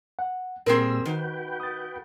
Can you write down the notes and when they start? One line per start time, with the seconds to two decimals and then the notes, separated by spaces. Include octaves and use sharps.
0.19 F#5
0.66 A#2 G3 C4 G#4 A#4 C5 E6
1.05 D#3 F#4 B4 G5
1.60 D#6 A6